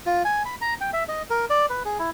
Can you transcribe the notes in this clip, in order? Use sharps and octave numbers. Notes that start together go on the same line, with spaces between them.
F4
G#5
B5
A#5
G5
E5
D#5
A#4
D5
B4
G#4
E4